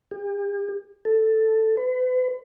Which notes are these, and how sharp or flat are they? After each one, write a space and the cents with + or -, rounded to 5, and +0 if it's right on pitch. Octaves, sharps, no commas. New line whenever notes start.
G4 +45
A4 +5
B4 +40